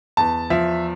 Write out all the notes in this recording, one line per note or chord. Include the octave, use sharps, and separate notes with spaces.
E2 A5
F3 E5